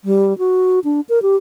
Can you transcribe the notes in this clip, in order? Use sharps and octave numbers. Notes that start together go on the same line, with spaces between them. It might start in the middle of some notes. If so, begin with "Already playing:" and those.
G3
F#4
D4
A#4
G4